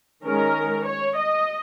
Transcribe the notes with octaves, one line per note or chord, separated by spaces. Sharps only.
D#3 G#3 C#4 A#4
C#5
D#5